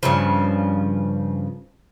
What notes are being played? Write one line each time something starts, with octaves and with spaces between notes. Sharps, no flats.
G2 C#3 F3